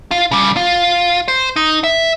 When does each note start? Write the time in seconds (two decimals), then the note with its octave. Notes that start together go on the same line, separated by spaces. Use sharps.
0.11 F4
0.31 C#3 G3
0.57 F4
1.28 C5
1.56 D#4
1.84 E5